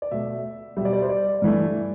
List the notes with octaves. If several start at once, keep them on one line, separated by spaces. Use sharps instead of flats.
D5
B2 A3 E5
B2 G3 D5 E5
D5
C5
D5
G2 E3 A3